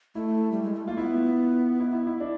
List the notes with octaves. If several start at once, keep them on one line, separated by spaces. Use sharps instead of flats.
A3 E4
G3
G#3
A3
A#3 F4
B3 E4
E4
E4
E4
D4